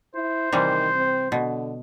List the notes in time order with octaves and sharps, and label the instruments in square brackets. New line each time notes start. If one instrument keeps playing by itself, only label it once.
[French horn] E4 [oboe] C5
[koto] C3 E3 G3 [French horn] D#3
[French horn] C4
[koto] B2 [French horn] D3